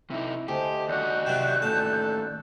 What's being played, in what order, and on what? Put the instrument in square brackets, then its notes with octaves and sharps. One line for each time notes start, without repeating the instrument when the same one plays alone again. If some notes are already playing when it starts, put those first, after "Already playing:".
[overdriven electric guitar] C3 D#4 [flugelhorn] E4
[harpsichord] D2 [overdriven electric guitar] G4 [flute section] C5 G#5 A5 [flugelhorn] D#5
[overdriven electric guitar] D#2 F#4 [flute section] D5 F#6 G6
[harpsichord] C3 F#3 C4
[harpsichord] A1 A5 [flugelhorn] A4